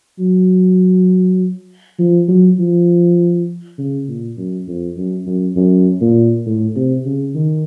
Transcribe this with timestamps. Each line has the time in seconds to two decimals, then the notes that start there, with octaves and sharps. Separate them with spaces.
0.19 F#3
1.99 F3
2.28 F#3
2.59 F3
3.78 C#3
4.08 A#2
4.37 F#2
4.68 F2
4.97 F#2
5.27 F#2
5.56 F#2
6.01 A#2
6.46 A2
6.76 C3
7.05 C#3
7.35 D#3